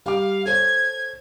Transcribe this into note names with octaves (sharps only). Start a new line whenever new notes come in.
G3 F5 D6
A4 C5 C#5 G#6